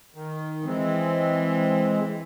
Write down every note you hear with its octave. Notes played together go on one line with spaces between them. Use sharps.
D#3
E3 G#3 C4